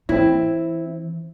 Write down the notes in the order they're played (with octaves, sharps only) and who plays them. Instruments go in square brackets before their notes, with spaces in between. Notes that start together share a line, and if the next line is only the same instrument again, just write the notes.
[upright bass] E3 [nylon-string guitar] C4 E4